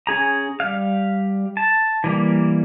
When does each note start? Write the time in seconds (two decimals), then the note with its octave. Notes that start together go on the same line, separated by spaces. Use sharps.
0.07 C#4 G#4 A#5
0.60 G3 F5
1.57 A5
2.04 E3 G3 A#3